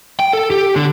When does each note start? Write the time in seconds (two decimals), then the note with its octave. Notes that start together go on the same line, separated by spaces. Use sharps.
0.20 G5
0.33 A4
0.51 G4
0.76 D3